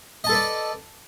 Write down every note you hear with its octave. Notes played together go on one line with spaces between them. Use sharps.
A4 B4 D5 D#5 A5